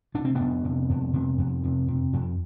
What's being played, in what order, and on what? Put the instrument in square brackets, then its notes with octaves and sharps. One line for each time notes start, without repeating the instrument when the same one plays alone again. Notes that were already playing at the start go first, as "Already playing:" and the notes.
[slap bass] C3 D4
C4
F2 B3 D4
C3
F2
C3
F2
C3
C3
F2